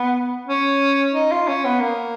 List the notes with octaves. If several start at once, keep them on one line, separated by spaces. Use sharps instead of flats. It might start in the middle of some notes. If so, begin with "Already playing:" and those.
Already playing: B3
C#4
D#4
F4
C#4
B3
A#3